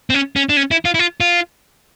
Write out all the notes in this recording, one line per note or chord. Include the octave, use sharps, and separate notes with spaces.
C4
C#4
C#4
D4
C#4
E4
F4
E4
F4
F4